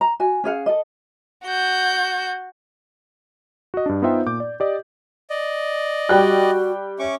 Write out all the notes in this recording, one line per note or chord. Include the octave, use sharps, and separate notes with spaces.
A#5
F#4 G#5
C#4 G#4 F5 F#5
A4 D#5
F#4 G6
F#4 D#5
G2 D4
B3 D#4 F4 C5 E5 G5
A#2 D6 G6
D5
G4 D5 D#5
D5 D#5
G3 F#4 G5 F#6
C#4 E5 C#6 D6